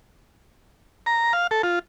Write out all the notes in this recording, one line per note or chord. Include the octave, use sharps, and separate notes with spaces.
A#5
F5
A4
F4